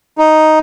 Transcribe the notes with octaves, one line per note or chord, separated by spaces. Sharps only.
D#4